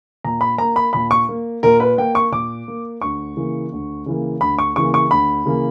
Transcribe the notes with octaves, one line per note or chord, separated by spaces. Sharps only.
A#2 A#5
B5
A#3 A#5
B5
A#2 B5
C#6
A#3
A#2 A#4
B4
A#3 G5
C#6
A#2 D6
A#3
D2 C#6
C#3 E3 A#3
D2
C#3 E3 A#3
D2 B5
C#6
C#3 E3 A#3 C#6
C#6
D2 B5
C#3 E3 A#3